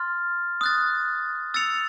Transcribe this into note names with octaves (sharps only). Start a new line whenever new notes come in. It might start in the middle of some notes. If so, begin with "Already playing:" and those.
Already playing: C6 F6 A6
D#6 F#6 A6
E6 A6 C#7 F7